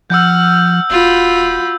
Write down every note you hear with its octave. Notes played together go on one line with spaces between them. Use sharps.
F3 F#5 E6 F6 G6
D#1 F4 F#4 B5